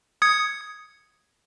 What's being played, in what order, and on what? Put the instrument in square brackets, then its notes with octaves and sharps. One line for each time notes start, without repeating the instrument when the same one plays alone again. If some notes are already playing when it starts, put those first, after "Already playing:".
[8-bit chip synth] D#6 G#6 C#7